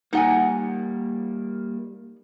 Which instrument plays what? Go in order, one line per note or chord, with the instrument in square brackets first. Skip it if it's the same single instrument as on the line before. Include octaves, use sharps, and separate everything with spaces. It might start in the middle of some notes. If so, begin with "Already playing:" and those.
[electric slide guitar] G3 A#3 [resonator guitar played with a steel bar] D#4 F#5 G#5